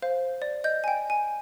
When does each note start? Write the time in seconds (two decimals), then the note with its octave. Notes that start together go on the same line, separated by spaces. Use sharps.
0.02 C5 F5
0.42 D5
0.64 D#5 G6
0.84 G5 G#5
1.10 G#5